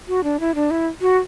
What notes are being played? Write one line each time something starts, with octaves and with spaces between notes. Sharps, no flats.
F#4
D4
E4
D4
E4
F#4